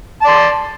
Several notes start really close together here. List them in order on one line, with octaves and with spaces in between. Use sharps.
A5 D5 C6